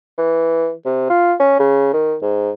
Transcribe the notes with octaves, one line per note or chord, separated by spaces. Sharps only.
E3
C3
F4
C#4
C#3
D#3
G#2